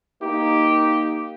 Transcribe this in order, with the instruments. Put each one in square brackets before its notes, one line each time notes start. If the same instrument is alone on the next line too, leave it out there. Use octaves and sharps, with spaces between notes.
[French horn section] A#3 D#4 [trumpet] G4